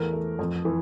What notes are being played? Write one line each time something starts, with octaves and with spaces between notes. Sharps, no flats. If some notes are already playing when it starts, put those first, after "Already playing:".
Already playing: E2 A3 A#4
A3
F2
E3